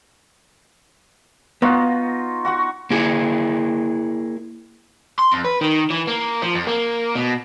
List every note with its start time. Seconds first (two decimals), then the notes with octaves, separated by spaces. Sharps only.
1.62 B3 D#4 F4 F#4
2.45 F#4 F#5 C#6
2.90 A#3 E4 G#4
5.19 C6
5.32 F2
5.44 B4
5.61 D#3
5.91 E3
6.08 A#3
6.42 F3
6.55 F2
6.67 A#3
7.16 B2